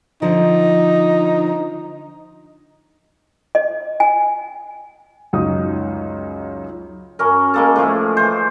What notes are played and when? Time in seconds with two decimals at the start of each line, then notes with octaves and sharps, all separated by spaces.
0.22 D3 F3 D#4
3.55 D#5
4.00 G#5
5.33 C#2 F#2 D#4 C#5 D#6
7.19 F#2 C#4 A#4
7.54 G#3 A#3 A4
7.76 A2 F3 G#3 E4
8.17 E3 C5